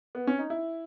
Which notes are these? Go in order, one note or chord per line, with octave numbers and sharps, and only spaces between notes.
B3
C#4
D#4
E4